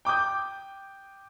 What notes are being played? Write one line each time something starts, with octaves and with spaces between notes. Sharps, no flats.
G5 D6 D#6 G6